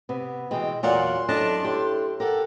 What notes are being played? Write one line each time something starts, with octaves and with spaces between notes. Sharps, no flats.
C3 B3
B2 E3 G#3 G5
E2 A#2 F#3 D5 F#5 C6
F#2 A2 D4 D#5 A5
A2 G4
G4 A4 A#4 F#5